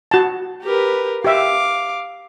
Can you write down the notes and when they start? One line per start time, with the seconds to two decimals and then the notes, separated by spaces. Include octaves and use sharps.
0.11 F#4 A5
0.64 G4 A#4 B4
1.24 G4 E5 F5 D6